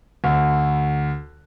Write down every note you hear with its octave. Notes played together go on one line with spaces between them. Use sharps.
D2